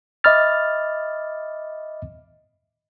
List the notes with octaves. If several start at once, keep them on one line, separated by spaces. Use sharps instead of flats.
D#5 E5 B5 D6 F6 A6